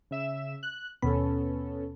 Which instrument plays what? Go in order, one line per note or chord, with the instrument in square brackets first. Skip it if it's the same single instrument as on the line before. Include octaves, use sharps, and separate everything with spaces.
[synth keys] C#3 E5 E7
F#6
[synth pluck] D#2 B2 B5 [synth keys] B3 C#4 A4